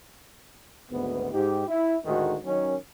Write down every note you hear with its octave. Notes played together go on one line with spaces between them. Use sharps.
G#1 D2 G#2 B3
G#2 D#4 G4
E4
D2 A2 D#3 G#3 D#4 F#4
D#3 F#3 C#4